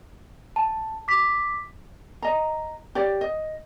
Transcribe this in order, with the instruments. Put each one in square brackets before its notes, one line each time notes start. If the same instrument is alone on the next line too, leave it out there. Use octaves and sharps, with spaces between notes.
[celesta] A5
D6 B6
[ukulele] D#5 A#5
G4 C#5 D5
D#5